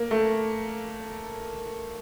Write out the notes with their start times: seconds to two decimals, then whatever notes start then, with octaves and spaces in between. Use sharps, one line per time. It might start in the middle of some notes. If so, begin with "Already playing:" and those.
Already playing: A#3
0.11 A3